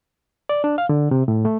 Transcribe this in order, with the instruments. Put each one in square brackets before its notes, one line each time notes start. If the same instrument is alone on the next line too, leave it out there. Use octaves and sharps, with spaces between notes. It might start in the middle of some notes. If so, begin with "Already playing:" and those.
[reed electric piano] D5
D4
F5
D3
C3
A2
A3